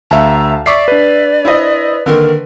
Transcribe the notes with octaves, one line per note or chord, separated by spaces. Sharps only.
D2 E5 F5 A5 A#5
D5 E5 C#6 D6 C7
D4 B4
E4 C5 D#5
D3 D#3 A#3 A#4